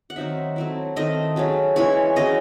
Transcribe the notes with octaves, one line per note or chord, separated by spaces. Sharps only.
F#5
D#3 F#3 C4 D#4 E5
F#3 A3 C4 E4
D#3 A3 C4 D#5
C#3 F#3 A3 C#4
E3 G#3 C#4 E4 C#5
C#3 F#3 C#4 E4 D#5